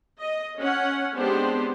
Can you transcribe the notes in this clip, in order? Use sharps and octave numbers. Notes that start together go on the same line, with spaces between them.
D#5
C#4 F#5
G#3 B3 C4 D4 G4 C5